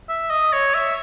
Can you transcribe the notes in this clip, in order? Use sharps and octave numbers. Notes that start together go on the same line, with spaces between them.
E5
D#5
C#5
E5